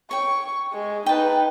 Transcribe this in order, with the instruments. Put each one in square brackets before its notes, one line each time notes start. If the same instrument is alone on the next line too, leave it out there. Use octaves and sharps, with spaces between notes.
[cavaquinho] C#5 G5 [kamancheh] C#6
[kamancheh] G#3
[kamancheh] D#4 B4 [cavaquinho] G5 A5